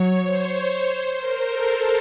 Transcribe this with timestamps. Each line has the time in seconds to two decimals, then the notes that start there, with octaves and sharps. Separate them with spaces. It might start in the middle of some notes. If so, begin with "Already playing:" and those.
Already playing: F#3 C#5
0.22 C5
0.85 C5
1.16 A#4
1.47 A4